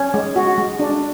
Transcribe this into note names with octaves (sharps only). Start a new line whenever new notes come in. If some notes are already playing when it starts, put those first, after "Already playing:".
Already playing: C#4
G#3
F#4
G#3
D4